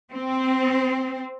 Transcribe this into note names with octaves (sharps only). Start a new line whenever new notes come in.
C4